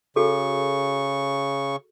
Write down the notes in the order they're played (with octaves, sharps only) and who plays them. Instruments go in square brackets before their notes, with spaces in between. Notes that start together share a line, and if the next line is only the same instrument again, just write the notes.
[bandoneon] C#3 C#6 [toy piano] F#4 G#4 A4